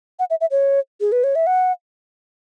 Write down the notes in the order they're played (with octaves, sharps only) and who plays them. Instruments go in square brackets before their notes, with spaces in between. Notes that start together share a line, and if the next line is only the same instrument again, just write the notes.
[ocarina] F#5
E5
E5
C#5
G#4
B4
C#5
E5
F#5